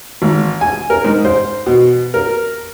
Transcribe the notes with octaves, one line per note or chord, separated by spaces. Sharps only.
G#1
G#5
A#4
G#2
C5
B2
A#4